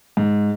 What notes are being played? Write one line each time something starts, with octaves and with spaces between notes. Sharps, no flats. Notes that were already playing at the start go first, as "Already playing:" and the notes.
G#2